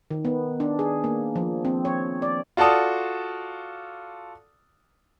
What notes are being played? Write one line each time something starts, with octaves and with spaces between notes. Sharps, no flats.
D#3
B3
D4
G#4
A#3
F3
C4
C#5
D5
F4 F#4 A4 D5 A5 D#6